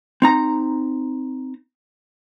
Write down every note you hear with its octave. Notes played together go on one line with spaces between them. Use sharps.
C4 D#4 A#5